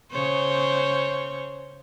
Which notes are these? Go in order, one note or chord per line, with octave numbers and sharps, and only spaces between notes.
C#3 C5 C#5